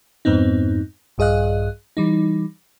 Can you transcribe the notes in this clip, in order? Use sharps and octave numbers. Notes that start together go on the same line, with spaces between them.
F2 G#2 B3 C4 D#4
A#1 G2 G#4 D#5 F5 F#6
E3 G3 D#4